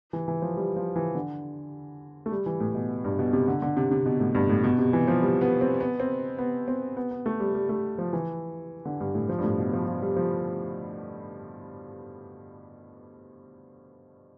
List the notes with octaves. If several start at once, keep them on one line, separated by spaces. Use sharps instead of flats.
E3
E3
F3
G3
F3
E3
D3
A3
G3
E3
A2
B2
G2
B2
C3
D3
D3
C3
C3
B2
A2
G2
A2
B2
C3
E3
F3
G3
B3
C4
B3
C4
B3
C4
B3
B3
A3
G3
G3
A3
F3
E3
D3
G2
A2
F3
G2
A2
B2
F3
F3
G3
F3